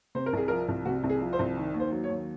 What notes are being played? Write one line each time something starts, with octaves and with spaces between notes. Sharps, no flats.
C3 C5
A#4
C2 G#4
F3 A#4
C2
C3 F#4
C2
G#4
F3
C5
C2
D#3
D#2
C5
F#3
C#5
D#2